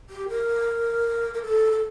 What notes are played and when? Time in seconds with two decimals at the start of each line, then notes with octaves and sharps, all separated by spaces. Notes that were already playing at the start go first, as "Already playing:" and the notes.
0.10 G4
0.29 A#4
1.34 A#4
1.42 A4
1.71 A4